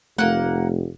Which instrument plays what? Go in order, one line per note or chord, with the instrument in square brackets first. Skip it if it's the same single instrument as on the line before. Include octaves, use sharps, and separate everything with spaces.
[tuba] F1 [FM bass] A3 [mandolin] A#3 F#5